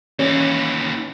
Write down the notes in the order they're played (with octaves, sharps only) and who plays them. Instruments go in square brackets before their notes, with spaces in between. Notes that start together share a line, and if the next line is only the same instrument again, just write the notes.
[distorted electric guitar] D#2 E3 [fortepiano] C#4